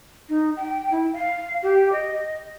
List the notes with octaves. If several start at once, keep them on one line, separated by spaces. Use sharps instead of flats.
D#4
G5
E4
F5
G4
D#5